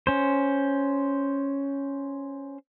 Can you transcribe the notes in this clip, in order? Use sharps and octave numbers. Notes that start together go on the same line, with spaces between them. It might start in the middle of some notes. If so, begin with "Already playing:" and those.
C#4 C5